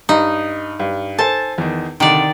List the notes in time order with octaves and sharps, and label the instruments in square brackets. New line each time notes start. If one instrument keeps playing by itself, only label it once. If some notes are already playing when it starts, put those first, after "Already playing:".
[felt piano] G2 [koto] D#4
[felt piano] G2
[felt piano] A4 C5 G#5 [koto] A5
[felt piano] E2 D#3
[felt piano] C2 D3 [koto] D#3 D5